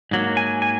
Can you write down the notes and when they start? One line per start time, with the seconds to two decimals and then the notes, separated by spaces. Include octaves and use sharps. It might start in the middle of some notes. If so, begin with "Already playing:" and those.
0.11 G#2 F#3 A#3
0.37 G#5
0.62 G#5